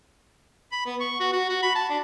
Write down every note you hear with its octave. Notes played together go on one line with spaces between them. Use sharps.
B5
B3
C#6
F#4
F#4
F#4
B5
A5
D4